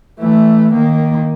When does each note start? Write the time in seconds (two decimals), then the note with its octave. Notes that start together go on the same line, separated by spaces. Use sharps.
0.19 E3 A3
0.72 D#3 A#3